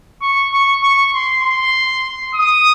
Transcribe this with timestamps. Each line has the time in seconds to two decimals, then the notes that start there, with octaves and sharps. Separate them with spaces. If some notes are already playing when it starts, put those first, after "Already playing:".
0.22 C#6
0.53 C#6
0.83 C#6
1.14 C6
1.44 C6
2.35 D#6